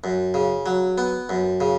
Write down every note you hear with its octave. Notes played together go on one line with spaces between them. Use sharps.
F#2
C#3
F#3
B3
F#2
C#3